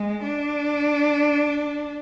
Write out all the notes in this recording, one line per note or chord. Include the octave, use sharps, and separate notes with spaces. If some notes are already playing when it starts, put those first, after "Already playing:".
Already playing: G#3
D4